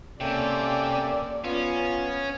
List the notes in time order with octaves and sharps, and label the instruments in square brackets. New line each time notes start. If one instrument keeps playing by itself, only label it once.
[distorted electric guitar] C3 [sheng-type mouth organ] A#3 C#4 A4 [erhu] D5 [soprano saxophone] G5
[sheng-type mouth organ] B3 [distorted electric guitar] C#4 [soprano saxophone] F4